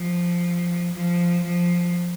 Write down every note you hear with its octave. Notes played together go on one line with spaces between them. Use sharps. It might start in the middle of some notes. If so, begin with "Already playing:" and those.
Already playing: F3
F3
F3